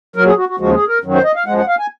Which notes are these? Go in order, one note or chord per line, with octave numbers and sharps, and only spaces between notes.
A#2 F#3 A#4
G#4
F#4
F#4
D#2 C#3 F3 G#3 F#4
G#4
A#4
F#2 D#3 F#3
C5
D#5
F5
F#2 F3 G#3 F#5
F#5
F5
G#5